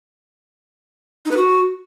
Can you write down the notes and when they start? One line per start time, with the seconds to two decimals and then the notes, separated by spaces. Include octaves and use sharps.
1.25 D#4
1.31 B4
1.37 F#4